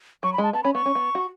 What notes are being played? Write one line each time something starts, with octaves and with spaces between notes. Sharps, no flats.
F#3 C#6
B5
G#3 A5
B3 A5
C#4 B5
B3 C#6
C#4
B3
F#4